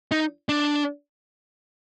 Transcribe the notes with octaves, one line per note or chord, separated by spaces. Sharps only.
D#4
D4